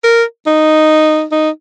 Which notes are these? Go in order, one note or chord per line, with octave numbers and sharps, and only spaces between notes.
A#4
D#4
D#4